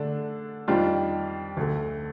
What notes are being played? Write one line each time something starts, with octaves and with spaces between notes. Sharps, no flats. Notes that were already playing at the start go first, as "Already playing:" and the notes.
Already playing: D3 A3 D4
F2 D#3 G3 D4 F4
D2 D3 A3